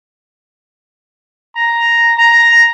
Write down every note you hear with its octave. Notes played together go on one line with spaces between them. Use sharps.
A#5
A#5